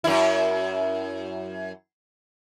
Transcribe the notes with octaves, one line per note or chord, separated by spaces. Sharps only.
F#2 E4